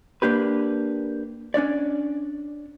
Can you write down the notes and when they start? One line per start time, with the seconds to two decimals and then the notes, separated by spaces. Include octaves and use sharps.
0.22 A#3 D4 G4 B4
1.54 C#4 D4 C#5 D5